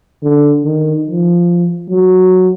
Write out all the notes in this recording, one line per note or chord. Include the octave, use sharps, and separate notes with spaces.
D3
D#3
F3
F#3